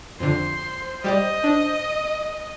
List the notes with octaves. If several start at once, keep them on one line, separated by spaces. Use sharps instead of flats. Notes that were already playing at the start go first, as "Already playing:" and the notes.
F2 D3 C5 C6
G3 G4 D5 D#5
D4